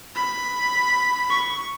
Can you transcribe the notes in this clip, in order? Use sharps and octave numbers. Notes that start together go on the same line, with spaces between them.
B5
C#6